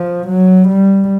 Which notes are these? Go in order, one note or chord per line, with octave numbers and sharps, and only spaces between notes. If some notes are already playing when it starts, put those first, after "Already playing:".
Already playing: F3
F#3
G3